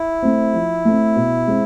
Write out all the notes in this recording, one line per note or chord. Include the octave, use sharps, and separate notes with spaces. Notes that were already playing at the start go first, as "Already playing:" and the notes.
Already playing: E4
A3 C4
F3
A3 C4
B2
G#3 C4